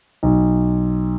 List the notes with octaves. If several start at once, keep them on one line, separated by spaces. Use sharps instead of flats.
B1